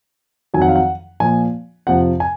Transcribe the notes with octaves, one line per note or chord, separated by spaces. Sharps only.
F2 D#3 F#3 G#5
F#5
F5
F#5
A#2 F3 G#5
F2 C3 F3 F#5
G#5